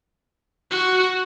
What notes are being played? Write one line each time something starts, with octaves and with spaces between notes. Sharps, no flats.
F#4